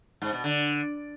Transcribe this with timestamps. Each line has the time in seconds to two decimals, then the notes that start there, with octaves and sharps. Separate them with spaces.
0.22 G#2
0.33 B2
0.44 D3